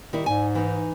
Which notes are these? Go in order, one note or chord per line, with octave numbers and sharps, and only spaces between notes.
D#3 G3 E4
G#2 G#5
E3 D#4